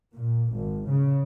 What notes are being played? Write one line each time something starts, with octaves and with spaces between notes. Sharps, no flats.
A#2
G#1
C#3